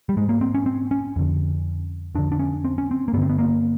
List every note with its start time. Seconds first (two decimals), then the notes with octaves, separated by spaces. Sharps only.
0.09 G3
0.17 G#2 G#3
0.29 A#3
0.41 C4
0.54 C#4
0.66 C4
0.91 C#4
1.16 F2 D3
2.15 F2 D3 D4
2.32 D4
2.39 C#4
2.65 C4
2.78 C#4
2.91 C4
3.08 A#3
3.13 G2 B3
3.18 D3 C4
3.29 B3
3.38 A#3